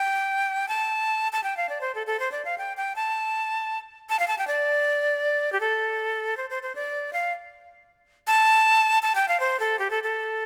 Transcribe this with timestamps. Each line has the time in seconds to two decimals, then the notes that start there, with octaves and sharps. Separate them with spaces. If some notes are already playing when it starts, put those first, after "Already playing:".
Already playing: G5
0.68 A5
1.33 A5
1.44 G5
1.57 F5
1.69 D5
1.81 C5
1.95 A4
2.07 A4
2.20 C5
2.32 D5
2.45 F5
2.58 G5
2.77 G5
2.96 A5
4.10 A5
4.19 F5
4.28 A5
4.38 G5
4.47 D5
5.52 G4
5.60 A4
6.37 C5
6.50 C5
6.63 C5
6.75 D5
7.13 F5
8.27 A5
9.03 A5
9.15 G5
9.28 F5
9.40 C5
9.60 A4
9.79 G4
9.90 A4
10.03 A4